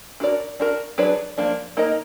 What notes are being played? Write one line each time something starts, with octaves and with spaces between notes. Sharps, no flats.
D4 F#4 A#4 D5
D4 F#4 A#4
F#3 D4 G#4 B4 D5
F3 A#3 D4
A#3 D#4 A#4 D#5